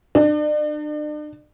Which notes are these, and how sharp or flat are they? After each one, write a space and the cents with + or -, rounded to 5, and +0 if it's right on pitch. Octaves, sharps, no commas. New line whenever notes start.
D4 +40